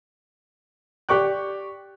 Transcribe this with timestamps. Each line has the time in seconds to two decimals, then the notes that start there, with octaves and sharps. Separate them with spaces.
1.09 G4 D5 C#6 D6 F#6